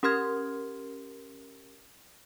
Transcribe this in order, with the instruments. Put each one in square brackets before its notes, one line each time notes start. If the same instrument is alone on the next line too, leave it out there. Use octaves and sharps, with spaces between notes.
[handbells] C#4 G4 A#4 C6 F6 G#6